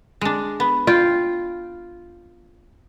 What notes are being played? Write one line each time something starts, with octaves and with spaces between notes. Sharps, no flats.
G#3 D4
B3
F4 G5